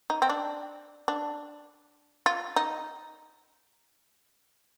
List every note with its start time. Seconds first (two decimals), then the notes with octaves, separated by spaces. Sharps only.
0.10 D#4
0.22 C4
0.29 D4
1.08 D4
2.26 F4
2.56 D#4